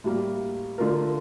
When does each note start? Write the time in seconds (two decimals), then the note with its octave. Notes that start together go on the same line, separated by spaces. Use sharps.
0.04 A2 G3 A#3
0.78 D3 A3 D4 F4 A#4